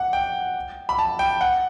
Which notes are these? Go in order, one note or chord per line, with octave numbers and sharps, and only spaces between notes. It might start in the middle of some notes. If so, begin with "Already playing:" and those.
Already playing: F#5
G5
B5
A5
G5
F#5